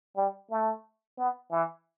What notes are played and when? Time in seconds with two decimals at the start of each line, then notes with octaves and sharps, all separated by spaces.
0.17 G3
0.50 A3
1.18 B3
1.52 E3